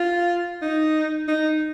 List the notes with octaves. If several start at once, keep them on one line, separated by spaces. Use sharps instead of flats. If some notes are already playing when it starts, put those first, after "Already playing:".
Already playing: F4
D#4
D#4